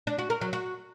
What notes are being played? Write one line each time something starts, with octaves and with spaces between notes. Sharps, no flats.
D4
F#4
A#4
F#3
F#4